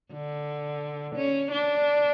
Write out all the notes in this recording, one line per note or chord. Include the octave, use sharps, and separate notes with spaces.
D3
C#4
D4